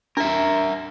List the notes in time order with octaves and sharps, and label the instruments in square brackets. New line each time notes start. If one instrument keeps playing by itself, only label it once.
[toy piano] D4 [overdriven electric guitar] A#4 E5